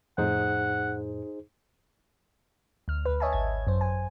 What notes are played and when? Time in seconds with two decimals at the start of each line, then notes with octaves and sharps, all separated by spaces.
0.18 F2 A2 D#4 G#4 C5 F#5
2.88 D2 F6
3.06 D2 B4
3.20 C#5 D#5 E5 G#5 A5
3.33 G#1 G#6
3.67 F#2 C5
3.81 G#5